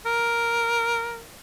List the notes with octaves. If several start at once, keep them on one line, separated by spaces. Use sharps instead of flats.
A#4